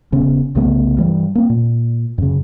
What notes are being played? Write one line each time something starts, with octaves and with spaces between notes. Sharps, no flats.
E1 C#3 B3 C#4
C2 C#3 A3 B3
G2 E3 G3
A#3 C4
A#2
F#2 C#3